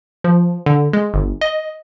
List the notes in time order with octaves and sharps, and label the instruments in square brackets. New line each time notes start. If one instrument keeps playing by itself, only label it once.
[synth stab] F3
D3
G#3
G1
D#5